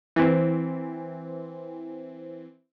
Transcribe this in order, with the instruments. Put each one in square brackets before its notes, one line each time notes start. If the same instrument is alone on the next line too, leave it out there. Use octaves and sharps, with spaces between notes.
[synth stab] E3 C4